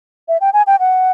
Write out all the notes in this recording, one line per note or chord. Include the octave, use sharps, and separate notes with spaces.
E5
G5
G#5
G5
F#5